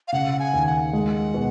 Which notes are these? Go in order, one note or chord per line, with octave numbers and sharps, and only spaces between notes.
F5
C#3 F#5
G#5
D#2
F#5
G#3
B2